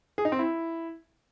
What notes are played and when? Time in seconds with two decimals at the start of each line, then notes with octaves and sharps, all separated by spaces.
0.18 G#4
0.25 D#4
0.32 C4
0.39 E4